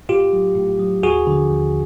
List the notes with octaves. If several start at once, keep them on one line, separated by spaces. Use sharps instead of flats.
A2 F4 G4
F#3
A2
F#3
D#2 F#4 G#4
D3 F3
D#2